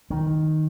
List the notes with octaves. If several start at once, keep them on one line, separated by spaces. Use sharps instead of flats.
D#3